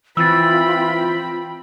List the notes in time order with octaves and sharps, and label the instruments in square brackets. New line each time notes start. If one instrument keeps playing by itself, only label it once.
[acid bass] E3 [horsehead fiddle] C4 B5 [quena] F4 [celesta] E6 A6